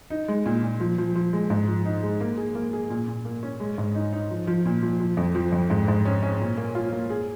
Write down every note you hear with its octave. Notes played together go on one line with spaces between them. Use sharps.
D#4
G#3
A#2
A#2
F3
F3
F3
G#3
G#2
F3
D#4
G#3
A#3
G#4
A#3
G#4
A#2
A#2
A#3
C#4
G#3
G#2
D#4
D#4
F3
F3
A#2
F3
F3
F2
F3
F2
G#2
G#2
C#4
C#4
A#2
A#3
F4
A#3
G#4